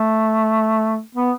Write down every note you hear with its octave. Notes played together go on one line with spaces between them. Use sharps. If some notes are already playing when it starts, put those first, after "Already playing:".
Already playing: A3
B3